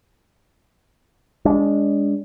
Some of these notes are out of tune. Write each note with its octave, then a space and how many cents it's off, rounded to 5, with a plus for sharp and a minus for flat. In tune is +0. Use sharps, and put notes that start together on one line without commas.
G#3 -20 D4 -30